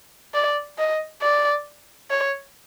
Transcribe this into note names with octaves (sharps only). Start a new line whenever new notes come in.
D5
D#5
D5
C#5